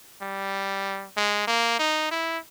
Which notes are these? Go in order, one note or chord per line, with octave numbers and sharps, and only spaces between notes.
G3
G#3
A#3
D#4
E4